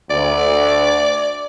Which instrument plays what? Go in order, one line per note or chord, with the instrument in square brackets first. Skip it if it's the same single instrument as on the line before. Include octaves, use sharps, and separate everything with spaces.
[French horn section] D2 [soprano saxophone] D5